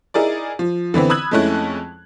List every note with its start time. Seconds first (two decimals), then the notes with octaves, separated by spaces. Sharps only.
0.14 D#4 E4 G#4 A#4 D5
0.59 F3
0.94 D3 E3 B3 C4
1.10 B5 D#6 E6 F#6 G#6 F#7
1.31 F2 G#3 A3 C#4 E4 F#6